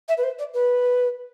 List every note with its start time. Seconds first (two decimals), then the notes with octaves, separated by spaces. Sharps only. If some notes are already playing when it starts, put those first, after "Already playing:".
0.08 E5
0.17 B4
0.23 C5
0.39 D5
0.54 B4